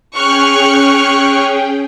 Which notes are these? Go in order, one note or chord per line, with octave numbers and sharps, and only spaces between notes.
C#4 G#4 G5 C#6 F6 F#6